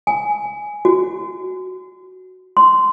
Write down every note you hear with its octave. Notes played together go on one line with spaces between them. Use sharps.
G#5
F#4
C6